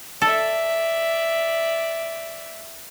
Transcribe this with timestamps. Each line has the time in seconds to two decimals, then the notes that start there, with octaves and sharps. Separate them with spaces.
0.22 A4 D5 E5